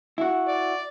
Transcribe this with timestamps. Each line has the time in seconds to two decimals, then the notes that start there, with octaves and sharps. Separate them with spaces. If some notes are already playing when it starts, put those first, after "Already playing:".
0.18 E4 F#4
0.47 D5